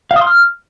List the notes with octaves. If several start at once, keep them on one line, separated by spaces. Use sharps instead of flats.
F5
D#6
C6
F6